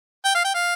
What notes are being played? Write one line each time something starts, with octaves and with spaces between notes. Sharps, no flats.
G5
F5
G5
F5